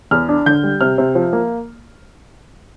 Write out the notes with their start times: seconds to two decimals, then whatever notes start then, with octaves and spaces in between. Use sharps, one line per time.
0.11 E2 F6
0.29 D4
0.46 D3 G6
0.63 G3
0.81 C3 F6
0.98 C3
1.15 F3
1.33 A#3